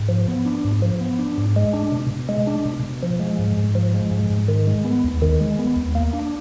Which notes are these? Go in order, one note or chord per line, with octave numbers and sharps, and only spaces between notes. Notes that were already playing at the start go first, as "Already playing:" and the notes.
Already playing: G#2
F3
B3
D4
G#2
F3
B3
D4
G#2
G#3
D4
B2
B2
G#3
D4
B2
B2
F3
G#3
G#2
G#2
F3
G#3
G#2
G#2
D#3
G#3
B3
D#2
D#3
G#3
B3
D#2
A#3
D4